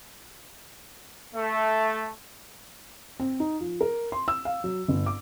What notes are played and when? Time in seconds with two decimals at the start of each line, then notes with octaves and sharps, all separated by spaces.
1.35 A3
3.20 C4
3.40 D#4
3.61 F3
3.81 A#4
4.12 C6
4.28 E6
4.45 F5
4.64 F#3
4.88 G1
5.06 D6